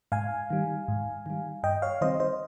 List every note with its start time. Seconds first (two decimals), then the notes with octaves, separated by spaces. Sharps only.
0.12 G#2 F5 G#5
0.50 D#3 G3
0.88 G#2
1.26 D#3 G3
1.63 G2 D#5 G5
1.82 C#5 F5
2.01 D#3 G3 C4 C5 D#5
2.20 C5 D#5